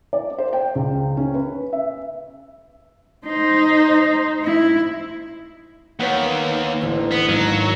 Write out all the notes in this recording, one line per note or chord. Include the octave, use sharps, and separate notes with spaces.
D5
C5
G5
C#2
C#4
B4
E5
D#4 C5
E4
D#2 D#3 B3 B4 C#5 F#5 G5
E6
A1 D2
B3 C7
G#2 D#3 F#3 A#3